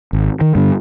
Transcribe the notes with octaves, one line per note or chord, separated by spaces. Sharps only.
G#1
D#3
G2 D3